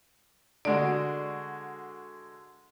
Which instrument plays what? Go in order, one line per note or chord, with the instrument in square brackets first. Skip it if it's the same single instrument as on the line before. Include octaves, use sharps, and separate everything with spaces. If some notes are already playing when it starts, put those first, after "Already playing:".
[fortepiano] D3 G#3 F#4 [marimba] D5